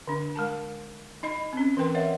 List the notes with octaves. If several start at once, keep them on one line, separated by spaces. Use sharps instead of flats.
D3 D4
G#3 A#4 A5
D#4 D#5 B5
C4 C#4
E3 A#4 B4 G5 C6
A#4 C#5 D#5 E5 F#5